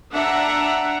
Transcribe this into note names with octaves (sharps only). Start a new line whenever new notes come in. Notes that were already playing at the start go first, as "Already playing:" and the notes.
D4 E5 F#5 A#5